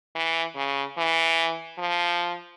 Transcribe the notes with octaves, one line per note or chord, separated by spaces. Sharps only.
E3
C#3
E3
F3